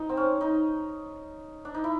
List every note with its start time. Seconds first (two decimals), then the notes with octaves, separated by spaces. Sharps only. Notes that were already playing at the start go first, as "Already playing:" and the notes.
Already playing: D#4
0.09 C4
0.17 C#4
0.41 D#4
1.65 D4
1.74 D#4
1.84 E4